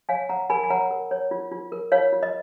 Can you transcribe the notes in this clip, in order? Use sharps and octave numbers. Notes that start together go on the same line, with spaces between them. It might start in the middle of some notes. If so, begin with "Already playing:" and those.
C#5 F5 G#5
C#5 F#5 A#5
A#4 G#5 B5
G#5
C#5 F#5 A#5
A#4
C#5
F4
F4
A#4
F4 C#5 F5
F4
D#5